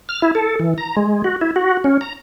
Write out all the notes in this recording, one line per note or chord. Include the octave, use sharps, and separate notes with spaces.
F6
E4
A4
E3
A#5
G#3
F#4
E4
F#4
C#4
A#5